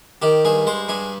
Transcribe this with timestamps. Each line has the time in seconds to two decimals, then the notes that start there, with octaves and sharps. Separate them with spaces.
0.22 D#3 G4
0.45 G2 G#4
0.67 G#3 C5
0.89 G2 G#4